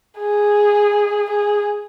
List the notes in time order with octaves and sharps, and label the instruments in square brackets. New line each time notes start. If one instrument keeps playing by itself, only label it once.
[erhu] G#4
G#4